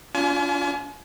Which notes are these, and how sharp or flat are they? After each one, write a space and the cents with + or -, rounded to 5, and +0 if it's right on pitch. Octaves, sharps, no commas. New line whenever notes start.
D4 -40 F4 +0 G#5 +40